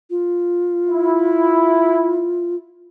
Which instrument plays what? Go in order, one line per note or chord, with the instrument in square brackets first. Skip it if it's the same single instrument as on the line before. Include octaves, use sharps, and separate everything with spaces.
[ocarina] F4
[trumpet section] E4